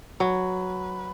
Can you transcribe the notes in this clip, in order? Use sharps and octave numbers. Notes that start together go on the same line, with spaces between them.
F#3 B4